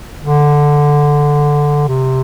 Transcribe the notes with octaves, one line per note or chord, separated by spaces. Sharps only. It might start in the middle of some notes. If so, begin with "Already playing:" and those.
D3
C3